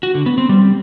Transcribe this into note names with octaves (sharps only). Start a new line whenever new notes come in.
F#4
D3
B3
C4
G3